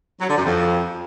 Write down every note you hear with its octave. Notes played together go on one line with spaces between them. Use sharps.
F#3
D3
F#2
F2